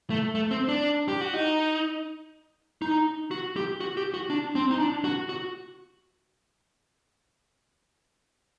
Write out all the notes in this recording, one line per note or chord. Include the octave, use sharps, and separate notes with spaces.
A3
A3
C4
D4
G4
F#4
D#4
D#4
F#4
G4
F#4
G4
F#4
D4
C4
D#4
D4
F#4
F#4